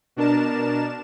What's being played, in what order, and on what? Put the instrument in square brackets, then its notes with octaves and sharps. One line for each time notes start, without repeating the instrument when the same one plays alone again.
[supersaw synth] B2 D4 A#4 A5 E7